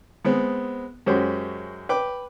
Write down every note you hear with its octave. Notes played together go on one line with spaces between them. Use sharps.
G#3 B3 C4
F#2 G#3 C#4 F#4 G4 C5
B4 G5 D6